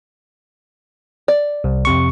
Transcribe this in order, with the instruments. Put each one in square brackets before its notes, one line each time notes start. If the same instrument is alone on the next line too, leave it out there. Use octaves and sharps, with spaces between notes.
[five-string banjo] D5
[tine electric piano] C2
F2 C3 C#6